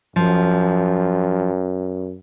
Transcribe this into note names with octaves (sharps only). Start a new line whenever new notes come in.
F#2 F3